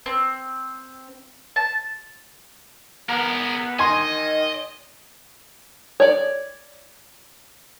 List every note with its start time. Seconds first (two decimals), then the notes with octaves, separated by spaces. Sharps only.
0.06 C4
1.56 A5
3.09 B3 G#4 A#4
3.79 D#3 D#5 G#5 C6
6.00 C#5 D5